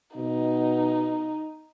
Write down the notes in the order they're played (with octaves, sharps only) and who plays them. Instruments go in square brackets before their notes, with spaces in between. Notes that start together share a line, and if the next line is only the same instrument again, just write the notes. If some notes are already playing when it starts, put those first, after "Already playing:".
[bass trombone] B2 [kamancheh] D#4